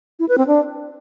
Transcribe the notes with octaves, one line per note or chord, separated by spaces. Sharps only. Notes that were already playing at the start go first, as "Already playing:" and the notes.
E4
B4
C4
D4